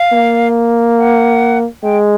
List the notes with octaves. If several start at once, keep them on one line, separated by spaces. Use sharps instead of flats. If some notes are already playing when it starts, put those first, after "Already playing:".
Already playing: F5
A#3
F#5
G#3 G5